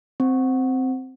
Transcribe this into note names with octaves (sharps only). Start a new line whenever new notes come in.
C4